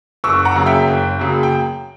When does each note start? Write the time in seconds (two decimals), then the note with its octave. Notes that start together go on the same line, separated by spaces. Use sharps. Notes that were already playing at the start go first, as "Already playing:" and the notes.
0.24 F#1 C#6 E6
0.45 F#5 A#5
0.55 F#2 C#3 F#3 A#3
0.66 E5 G5
0.88 F#1
1.19 F#2 C#3 F#3 A#3
1.43 G5